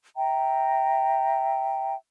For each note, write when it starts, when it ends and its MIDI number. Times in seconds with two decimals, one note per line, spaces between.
0.16 1.94 76
0.16 1.94 79
0.16 1.94 82